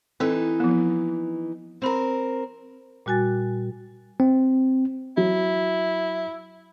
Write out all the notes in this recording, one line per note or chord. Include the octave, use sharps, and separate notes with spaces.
E3 C4 D#4 E4 A4
F3 B3
C4 A#4 C5 B5
A#2 G3 F#4 G#5 A6
C4
F#3 E4